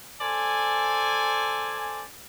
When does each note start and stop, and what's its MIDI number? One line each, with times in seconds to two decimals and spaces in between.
0.21 2.03 69
0.21 2.03 72
0.21 2.03 74
0.21 2.03 80